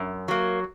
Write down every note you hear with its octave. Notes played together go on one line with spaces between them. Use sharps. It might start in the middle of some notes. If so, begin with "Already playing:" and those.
Already playing: F#2
F#3 A#3